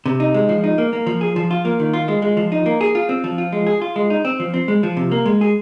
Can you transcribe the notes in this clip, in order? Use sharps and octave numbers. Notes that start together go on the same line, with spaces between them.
C3
D#4
G#3
F3
D#4
A#3
A#3
F3
G#4
F3
F4
A#3
D#3
F4
G#3
G#3
F3
D#4
A#3
G#4
F4
C4
F3
F4
G#3
G#4
F4
G#3
D#4
C4
F3
C4
G#3
F3
C3
A#3
G#3
G#4